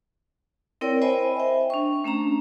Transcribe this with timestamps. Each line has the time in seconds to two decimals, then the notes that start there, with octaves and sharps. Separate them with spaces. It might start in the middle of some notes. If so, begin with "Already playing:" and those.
0.81 C4 E4 A#4 C#5 D5 G5
1.02 C5 D#5 G5 G#5 B5
1.37 E5 G5
1.70 D4 C#6
2.04 A3 C#4 D4 A#5